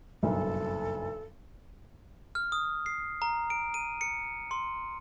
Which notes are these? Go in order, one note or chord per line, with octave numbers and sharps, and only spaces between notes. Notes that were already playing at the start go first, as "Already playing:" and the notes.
F#1 B1 G2 A4
F6
D#6
C7
A#5
D7
D#7
C#7
C6